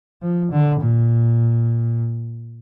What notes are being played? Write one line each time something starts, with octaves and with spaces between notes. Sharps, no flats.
F3
D3
A#2